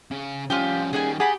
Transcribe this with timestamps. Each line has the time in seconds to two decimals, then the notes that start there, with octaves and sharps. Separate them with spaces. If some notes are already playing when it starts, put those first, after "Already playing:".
0.11 C#3 C#4
0.50 F3 G3 C#4 F4 G4 G5
0.93 D#3 G3 G#4 F#5 G#5
1.20 G4 G#4 F#5 A5 B5